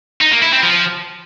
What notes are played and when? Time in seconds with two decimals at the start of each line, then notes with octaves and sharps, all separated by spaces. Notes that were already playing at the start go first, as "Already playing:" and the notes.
0.21 D#4
0.31 A#3
0.42 E4
0.52 C4
0.63 F3